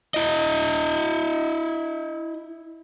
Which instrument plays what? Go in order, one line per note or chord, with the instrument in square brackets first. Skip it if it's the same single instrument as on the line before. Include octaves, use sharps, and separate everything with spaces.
[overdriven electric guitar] E4 D#5